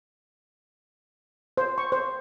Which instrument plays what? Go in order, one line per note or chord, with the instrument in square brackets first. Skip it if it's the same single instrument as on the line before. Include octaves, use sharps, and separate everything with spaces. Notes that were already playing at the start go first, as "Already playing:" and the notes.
[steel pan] C5
C#6
C5